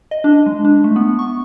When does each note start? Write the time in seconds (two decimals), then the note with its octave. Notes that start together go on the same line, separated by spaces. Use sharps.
0.11 D#5
0.24 D4
0.46 G#3
0.65 D4
0.84 A3
0.96 B3
1.19 C#6